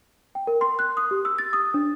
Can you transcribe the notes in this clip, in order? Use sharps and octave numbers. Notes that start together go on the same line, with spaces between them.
G5
A#4
C6
F#6
D#6
G4
E6
A6
D#6
D4